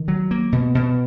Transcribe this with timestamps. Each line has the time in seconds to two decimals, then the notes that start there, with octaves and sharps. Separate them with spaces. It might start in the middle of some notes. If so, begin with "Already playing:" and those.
Already playing: D#3
0.08 F#3
0.31 A#3
0.52 B2
0.75 B2